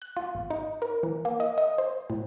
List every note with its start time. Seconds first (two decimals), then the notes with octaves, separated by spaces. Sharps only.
0.02 F#6
0.17 F4
0.35 G#1
0.50 D#4
0.82 A#4
1.03 E3
1.25 A#3
1.40 D#5
1.58 D#5
1.78 C5
2.10 A2